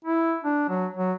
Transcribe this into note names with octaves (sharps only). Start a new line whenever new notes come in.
E4
D4
F#3
F#3